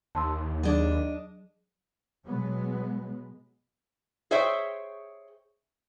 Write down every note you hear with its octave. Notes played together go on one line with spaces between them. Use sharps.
D#2 A5 C6 E6
F#3 D4 G#4 D#5
B2 F#3 G#3 B3
G#4 C5 C#5 E5 G5